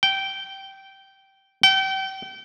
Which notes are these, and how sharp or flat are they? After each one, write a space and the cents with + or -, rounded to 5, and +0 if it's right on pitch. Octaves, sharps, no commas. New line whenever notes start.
G5 -15
G5 -35